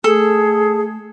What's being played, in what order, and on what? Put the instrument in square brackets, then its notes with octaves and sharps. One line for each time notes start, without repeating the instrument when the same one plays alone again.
[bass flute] A3 [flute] G#4 [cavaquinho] A4